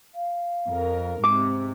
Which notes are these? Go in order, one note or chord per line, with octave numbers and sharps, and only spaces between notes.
F5
F2 A#4
G#2 C3 D6